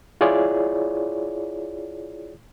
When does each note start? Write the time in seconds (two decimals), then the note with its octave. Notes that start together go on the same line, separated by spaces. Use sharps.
0.21 E4 F4 G#4 C#5 D5